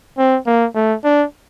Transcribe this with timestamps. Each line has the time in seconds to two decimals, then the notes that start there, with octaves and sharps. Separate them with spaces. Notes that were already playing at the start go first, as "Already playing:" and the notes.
0.18 C4
0.46 A#3
0.75 A3
1.04 D4